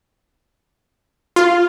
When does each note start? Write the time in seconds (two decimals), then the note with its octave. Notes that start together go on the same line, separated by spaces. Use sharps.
1.36 F4